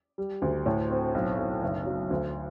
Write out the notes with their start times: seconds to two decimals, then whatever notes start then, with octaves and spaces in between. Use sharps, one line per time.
0.18 G3
0.42 D2
0.66 A2
0.90 C4
1.14 B1
1.38 B1
1.62 F#1
1.86 F#3
2.10 D2